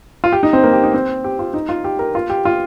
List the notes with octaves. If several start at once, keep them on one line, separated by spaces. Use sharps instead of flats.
F4
G4
D#4
C4
A#3
G4
D#4
C4
G4
F4
D#4
F4
G4
A#4
F4
G4
F4